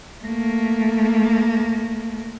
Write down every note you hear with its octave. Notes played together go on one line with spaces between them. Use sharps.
A3 A#3